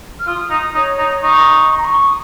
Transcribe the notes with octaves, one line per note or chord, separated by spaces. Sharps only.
F6
F4 D#6
D#4
D#4 C#5
D#4
D#4 C#6
C#6
A#5
C#6
D#6